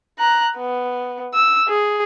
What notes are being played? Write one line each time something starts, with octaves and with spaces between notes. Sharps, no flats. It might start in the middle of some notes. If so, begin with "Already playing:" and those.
A#5 F#6
B3
E6
G#4